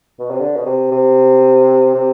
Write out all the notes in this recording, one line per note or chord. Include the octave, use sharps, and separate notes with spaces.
B2
C3
D3
B2
C3
C3
C3